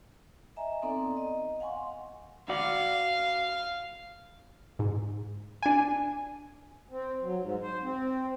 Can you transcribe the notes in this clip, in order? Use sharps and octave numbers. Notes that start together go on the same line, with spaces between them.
D#5 E5 G#5 A#5
B3 C4 D#4 A4 D5 A#5
D#5
F5 F#5 G#5 C6 C#6
F#4 D5 F5
G#2
D4 G#5
C4
F#3
G#2
C5
C4